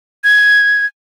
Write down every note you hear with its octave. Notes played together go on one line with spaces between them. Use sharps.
G#6